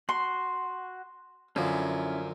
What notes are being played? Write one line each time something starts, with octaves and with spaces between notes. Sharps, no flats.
F#4 C6
F#2 D3 F3 C#4 E4